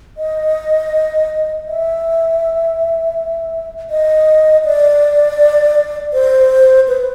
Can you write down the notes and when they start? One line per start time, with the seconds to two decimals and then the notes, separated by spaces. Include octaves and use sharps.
0.17 D#5
1.67 E5
3.90 D#5
4.65 D5
6.13 C5
6.88 B4